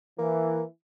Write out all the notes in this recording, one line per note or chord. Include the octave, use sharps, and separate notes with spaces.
E3 A#3